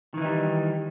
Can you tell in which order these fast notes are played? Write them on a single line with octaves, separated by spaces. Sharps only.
D#3 E3 D#4 G3